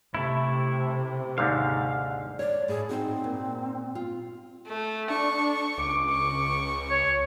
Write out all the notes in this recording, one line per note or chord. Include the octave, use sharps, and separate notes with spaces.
C3 A3 E4
D#2 G#2 D3 F5
C#5 D5
A2 G#4
C4 D#4 F#4
A#2
F4
A3
D4 C#6
C#2 D6
C#6
C#5